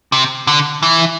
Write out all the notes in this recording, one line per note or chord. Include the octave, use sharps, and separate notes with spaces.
C3
D3
E3